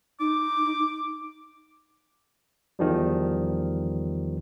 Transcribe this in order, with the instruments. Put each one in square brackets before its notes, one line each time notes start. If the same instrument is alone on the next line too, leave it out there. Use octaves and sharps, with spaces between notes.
[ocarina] D#4 [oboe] D6
[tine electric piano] E2 D#3 F3 G3